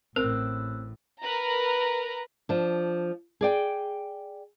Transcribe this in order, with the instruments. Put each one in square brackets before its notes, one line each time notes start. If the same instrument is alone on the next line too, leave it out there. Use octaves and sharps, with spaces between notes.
[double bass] A1 A2 [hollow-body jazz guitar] C4 [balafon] A#4 [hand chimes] E6 F#6
[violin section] A#4 B4 A#5
[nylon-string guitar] F3 D4
G#4 D5 G5